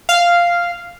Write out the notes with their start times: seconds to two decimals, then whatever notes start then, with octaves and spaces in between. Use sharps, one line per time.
0.09 F5